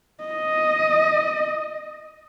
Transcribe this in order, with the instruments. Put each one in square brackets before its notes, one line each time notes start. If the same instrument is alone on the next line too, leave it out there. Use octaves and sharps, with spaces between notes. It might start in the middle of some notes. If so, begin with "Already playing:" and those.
[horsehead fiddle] D#5